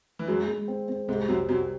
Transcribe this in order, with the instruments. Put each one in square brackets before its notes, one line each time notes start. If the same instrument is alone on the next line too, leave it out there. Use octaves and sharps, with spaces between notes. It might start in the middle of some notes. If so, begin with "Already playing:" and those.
[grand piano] E3
[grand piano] F#2 F#3 [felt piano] G#3
[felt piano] G#3
C4
C4
[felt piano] C2 [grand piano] G#2 G#3
[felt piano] C2 [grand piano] F#2 F#3
[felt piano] C2 [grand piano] F#2 F#3